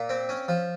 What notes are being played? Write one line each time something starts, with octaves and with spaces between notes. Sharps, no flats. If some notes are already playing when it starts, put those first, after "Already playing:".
Already playing: A#2
C4
C#4
F3